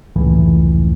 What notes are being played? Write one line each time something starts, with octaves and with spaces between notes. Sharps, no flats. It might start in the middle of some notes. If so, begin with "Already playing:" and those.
F1 C#2 A2 E3